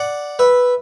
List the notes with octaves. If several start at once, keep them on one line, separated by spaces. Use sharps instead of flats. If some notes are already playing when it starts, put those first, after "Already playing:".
Already playing: D5 F#5
B4 E5